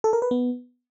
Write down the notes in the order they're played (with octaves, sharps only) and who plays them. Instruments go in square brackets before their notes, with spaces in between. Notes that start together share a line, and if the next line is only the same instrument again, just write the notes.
[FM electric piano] A4
A#4
B4
B3